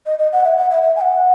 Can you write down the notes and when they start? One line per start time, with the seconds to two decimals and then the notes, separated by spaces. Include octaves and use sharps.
0.06 D#5
0.19 D#5
0.33 F#5
0.45 E5
0.57 F#5
0.70 E5
0.83 E5
0.96 G#5
1.01 F#5